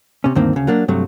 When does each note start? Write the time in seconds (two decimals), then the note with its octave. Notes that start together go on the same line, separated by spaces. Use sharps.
0.24 C3 C#4
0.35 D2 G2 D#3 A#3 C4
0.53 D2 C#3
0.67 F#3 A#3 D4
0.88 G2 C3 F#3 A3